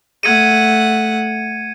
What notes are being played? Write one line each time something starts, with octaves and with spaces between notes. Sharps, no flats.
A3 F#5 G#6 C#7 D#7